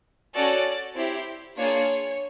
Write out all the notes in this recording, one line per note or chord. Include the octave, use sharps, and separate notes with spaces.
C#4 F#4 A4 D5
C4 E4 G4
A#3 D4 F4 G#4 C#5